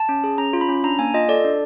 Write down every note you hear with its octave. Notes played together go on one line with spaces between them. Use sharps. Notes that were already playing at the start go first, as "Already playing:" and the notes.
Already playing: A5
C#4
G#4
C#4 A#5
F4
B5
C#4
D4 A#5
A#3 G#5
F4 D#5
A4 D5
D4